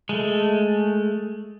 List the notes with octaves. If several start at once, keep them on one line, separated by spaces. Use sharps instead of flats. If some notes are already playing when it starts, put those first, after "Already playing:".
G#3 A3